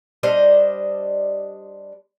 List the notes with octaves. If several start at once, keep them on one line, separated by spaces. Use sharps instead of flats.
G3 D4 C5 D#5